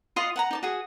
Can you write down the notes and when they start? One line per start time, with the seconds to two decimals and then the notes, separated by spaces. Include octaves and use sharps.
0.16 F4 D#5 F#5 C6
0.36 F#5 A5 A#5
0.51 D#4 D5 A5
0.63 F#4 G#4